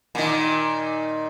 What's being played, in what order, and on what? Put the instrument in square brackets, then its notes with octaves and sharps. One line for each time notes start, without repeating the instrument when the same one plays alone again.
[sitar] A#2 D#3